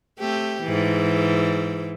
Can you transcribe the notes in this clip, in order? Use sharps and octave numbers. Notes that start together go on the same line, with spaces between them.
A3 C4 G4
G#2 E3